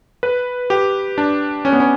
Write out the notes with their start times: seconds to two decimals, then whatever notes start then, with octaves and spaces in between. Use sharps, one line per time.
0.23 B4
0.70 G4
1.18 D4
1.65 C#4
1.73 B3
1.80 C#4